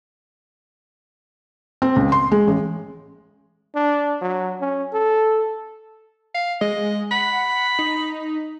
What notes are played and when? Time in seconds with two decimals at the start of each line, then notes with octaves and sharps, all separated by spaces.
1.82 C4
1.96 C#2
2.12 C6
2.32 G#3
2.47 A1
3.75 D4
4.22 F#3
4.61 C#4
4.93 A4
6.35 F5
6.61 G#3 D#5
7.11 F#5 B5
7.79 D#4